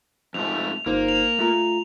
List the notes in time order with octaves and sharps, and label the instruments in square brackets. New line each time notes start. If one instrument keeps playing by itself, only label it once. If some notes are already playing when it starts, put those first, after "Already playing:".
[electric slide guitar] F2 G#2 A3 [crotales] F7
[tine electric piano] G1 D#4 C5 [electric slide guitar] A#3
[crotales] F7
[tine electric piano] A3 F4 A#5